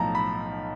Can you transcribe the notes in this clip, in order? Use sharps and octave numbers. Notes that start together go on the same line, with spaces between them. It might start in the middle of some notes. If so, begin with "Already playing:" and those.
Already playing: B1 A2 F3 A5 A#5
B5